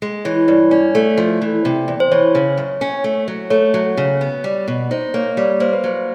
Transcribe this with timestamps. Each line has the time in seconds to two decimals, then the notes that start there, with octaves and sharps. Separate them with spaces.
0.02 G#3
0.25 E3 C#5
0.48 G2 C#5
0.71 C#4 D5
0.95 A3
1.18 F3
1.42 E3
1.65 C3
1.88 E2
2.00 C5
2.12 E3 C#5
2.35 C#3
2.58 F#2
2.81 C#4
3.04 A3
3.28 F#3
3.50 A3 C#5
3.74 F#3
3.97 C#3
4.21 B3
4.44 G3
4.68 B2
4.91 D#4 C5
5.14 A#3 C#5
5.37 G3 C#5
5.60 A#3 C5
5.73 B4
5.84 F#3 C5